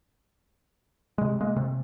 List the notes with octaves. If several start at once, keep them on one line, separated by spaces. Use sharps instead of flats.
C3 G#3
G#3 A#3
C3